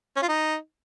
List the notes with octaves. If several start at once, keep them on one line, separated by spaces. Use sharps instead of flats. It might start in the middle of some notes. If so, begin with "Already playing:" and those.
C#4
F4
D#4